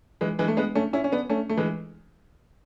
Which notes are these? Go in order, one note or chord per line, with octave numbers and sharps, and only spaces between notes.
E3 G#3
E3 G#3
A3
G#3 B3
A3 C#4
C#4 E4
C#4
B3 D4
A3 C#4
A3
E3 G#3